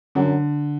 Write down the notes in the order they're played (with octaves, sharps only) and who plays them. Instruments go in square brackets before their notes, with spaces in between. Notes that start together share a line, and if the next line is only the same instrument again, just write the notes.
[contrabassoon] F#2 [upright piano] D3